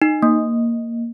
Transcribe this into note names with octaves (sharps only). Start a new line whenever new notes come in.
D#4
A#3